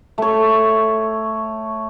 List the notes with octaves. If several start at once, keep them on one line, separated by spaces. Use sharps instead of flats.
A3 C#5